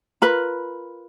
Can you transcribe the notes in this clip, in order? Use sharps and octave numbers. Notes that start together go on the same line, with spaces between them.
F4 A#4 B4 B5